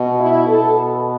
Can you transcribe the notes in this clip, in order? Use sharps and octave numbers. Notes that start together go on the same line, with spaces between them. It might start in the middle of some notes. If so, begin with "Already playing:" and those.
Already playing: B2
E4
B2 B3 A4